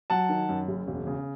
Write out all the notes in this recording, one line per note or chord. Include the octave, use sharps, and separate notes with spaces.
F#3 F#5 A5
D#3
F#2
F#1
E1
C#3